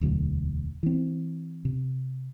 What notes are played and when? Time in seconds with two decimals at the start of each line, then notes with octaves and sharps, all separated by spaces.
0.01 E1 D2 D3 F#3
0.83 E3 C4
1.65 C3